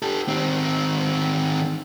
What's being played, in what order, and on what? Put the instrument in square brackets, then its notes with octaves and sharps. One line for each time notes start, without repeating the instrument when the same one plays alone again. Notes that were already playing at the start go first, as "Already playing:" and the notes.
[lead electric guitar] G4 A4
D#3 C4